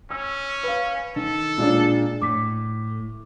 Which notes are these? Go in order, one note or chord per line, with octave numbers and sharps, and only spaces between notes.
C#4 E6
B4 F5
D#3 A4
A#2 G#3 D4
A2 D6 B6